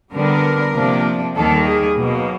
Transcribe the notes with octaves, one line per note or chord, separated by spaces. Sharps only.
D3 G3 B3 D4 A#4
C3 F3 A#3 D4
D#2 D#3 G3 A#3 A4
G#4
B2 F#3 A#3